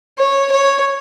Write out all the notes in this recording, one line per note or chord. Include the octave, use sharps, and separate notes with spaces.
C#5
C#5